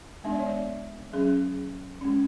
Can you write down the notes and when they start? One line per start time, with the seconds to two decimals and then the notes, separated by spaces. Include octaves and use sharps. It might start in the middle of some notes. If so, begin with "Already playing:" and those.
0.24 G#3 B3 D4 E5
0.32 D5
0.39 C#5
0.46 D5
1.13 F#3 C#4 G#4
2.01 G#3 C#4